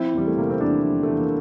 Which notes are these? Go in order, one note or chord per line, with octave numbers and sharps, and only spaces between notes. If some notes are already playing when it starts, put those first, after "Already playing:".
Already playing: F3 C4 E4
E2 G3
A3
C3 A#3
C4
E2 A#3 D4
F3
E2 A3
A#3